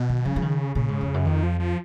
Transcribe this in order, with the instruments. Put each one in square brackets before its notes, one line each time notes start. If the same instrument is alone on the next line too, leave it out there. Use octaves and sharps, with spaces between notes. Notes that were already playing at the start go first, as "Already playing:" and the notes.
Already playing: [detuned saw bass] B2
[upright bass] D#3
[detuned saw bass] C#3 [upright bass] F3
[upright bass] F3
D#3
[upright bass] A#2 [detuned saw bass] C#3
[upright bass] G#2
F2
F#2
[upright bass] F2 [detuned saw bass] D#3
[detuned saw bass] F3
F3